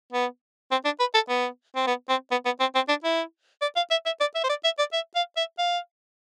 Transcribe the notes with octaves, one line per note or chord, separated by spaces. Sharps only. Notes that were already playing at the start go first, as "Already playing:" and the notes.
B3
C4
D4
B4
A4
B3
C4
B3
C4
B3
B3
C4
C4
D4
E4
D5
F5
E5
E5
D5
E5
C5
D5
E5
D5
E5
F5
E5
F5